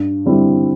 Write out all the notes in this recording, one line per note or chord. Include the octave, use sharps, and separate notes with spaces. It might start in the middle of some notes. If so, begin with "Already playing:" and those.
Already playing: G2
D3 G3 C4 E4